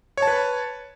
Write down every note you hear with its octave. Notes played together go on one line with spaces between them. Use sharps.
B4 C#5 A5